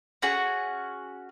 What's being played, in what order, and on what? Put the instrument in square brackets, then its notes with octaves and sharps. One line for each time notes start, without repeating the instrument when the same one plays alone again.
[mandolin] C#4 F#4 G#4